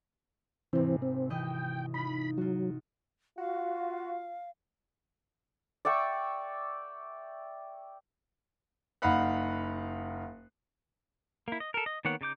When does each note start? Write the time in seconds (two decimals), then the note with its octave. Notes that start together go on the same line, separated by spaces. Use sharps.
0.73 G#1 C3 E3 C4
1.02 C4
1.30 E3 D#5 G5 E6
1.94 D#4 F4 B5
2.38 F#3 F4 F#4
3.38 F4 F#4 F5
5.85 D5 E5 G5 C#6
9.02 F#1 D#4 F5 F#5 B5 F#6
11.48 A#3 E4
11.60 D#5
11.74 A4 A#4
11.86 D#5
12.05 D#3 A#3 B3 C#5 F#5
12.21 C#3 D#4 D6 G6